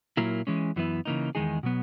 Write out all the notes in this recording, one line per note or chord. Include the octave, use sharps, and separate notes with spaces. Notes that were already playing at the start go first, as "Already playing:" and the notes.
A#2 F#3 A#3 E4 A#4
E3 G#3 C#4
F#2 E3 B3 E4
C#3 E3 A#3 D#4
E2 D#3 G#3 D#4 G#4
B2 F#3 B3